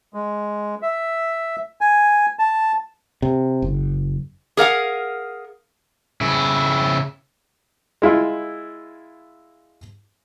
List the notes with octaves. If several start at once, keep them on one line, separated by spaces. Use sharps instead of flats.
G#3
E5
G#5
A5
C3
F#1
G#4 A#4 F5 F#5
C#3 E4
G#3 E4 F4